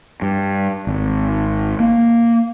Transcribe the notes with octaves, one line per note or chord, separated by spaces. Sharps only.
G2
G#1
A#3